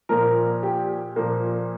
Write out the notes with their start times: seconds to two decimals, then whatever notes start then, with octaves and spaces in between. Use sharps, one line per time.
0.09 A#2 F3 A#4
0.63 G4
1.16 A#2 F3 A#3